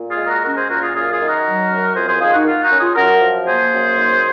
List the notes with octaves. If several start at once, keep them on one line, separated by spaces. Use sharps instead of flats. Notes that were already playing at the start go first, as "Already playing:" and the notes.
Already playing: A#2
F4 G#4
G#3
F#4 A#4
C#4 F#4 A#4
G#4 C5
A#2 F#4 A#4
F4 G#4
F#2 F4 G#4
F4 G#4
D#3
F#4 A#4
F#3
F#2
F2 G#4 C5
G#4 C5
D#3 F4 G#4
D#4 F#4
A#3 F4
D#4 F#4
C#4
F4 G#4
F#2 F#4 A#4
F3
A#3 G#4 C5
F#2
G#2